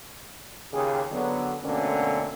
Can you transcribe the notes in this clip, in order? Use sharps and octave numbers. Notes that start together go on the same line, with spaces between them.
D#2 C#3 F4 G4 G#4
D3 F#3 B3
B2 D3 A3 A#3 C4 C#4